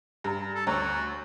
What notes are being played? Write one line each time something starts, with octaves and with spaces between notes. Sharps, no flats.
G2 G#5 A#5
A4
D2 F#4 C#5 A#5 B5